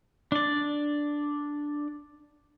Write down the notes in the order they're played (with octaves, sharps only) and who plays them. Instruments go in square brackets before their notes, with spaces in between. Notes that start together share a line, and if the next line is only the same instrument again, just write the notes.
[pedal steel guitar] D4 D5